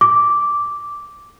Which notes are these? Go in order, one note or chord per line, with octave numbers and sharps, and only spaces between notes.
D6